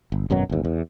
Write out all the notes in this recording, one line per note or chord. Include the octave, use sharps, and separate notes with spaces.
G1
G#1 F#2 B2 F#3
G1 D#2
E2